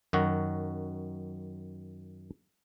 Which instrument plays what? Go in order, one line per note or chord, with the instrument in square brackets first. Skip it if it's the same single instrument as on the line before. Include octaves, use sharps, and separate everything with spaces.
[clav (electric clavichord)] F#2 D#3 F#4